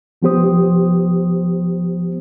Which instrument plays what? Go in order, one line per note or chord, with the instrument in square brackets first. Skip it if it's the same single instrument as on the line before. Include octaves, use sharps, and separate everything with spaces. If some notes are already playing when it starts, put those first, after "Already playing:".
[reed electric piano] C2 F3 B3 G4 C5 D#6